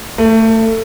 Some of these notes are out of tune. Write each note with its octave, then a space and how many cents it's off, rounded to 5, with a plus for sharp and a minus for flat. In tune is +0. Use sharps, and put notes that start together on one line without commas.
A3 +25